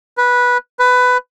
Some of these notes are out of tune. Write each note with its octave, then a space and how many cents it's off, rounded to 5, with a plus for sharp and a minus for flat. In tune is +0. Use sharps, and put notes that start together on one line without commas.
B4 -10
B4 +15